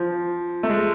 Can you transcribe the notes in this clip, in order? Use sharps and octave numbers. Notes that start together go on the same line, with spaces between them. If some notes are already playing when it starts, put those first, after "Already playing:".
Already playing: F3
A3
G#3